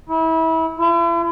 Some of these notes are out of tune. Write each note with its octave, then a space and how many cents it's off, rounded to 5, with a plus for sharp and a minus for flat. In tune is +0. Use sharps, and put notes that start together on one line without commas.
E4 -30
E4 +40